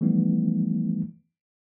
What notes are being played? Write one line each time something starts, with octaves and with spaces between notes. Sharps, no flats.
E3 F3 G3 A3 B3 D#4